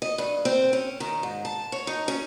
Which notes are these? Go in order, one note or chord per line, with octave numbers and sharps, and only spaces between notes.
D#5
G2
C4
C#4
D#3
G#2
A5
C#5
D#4
C#4